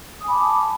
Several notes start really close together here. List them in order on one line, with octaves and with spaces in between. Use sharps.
D#6 G#5 B5 D6 A5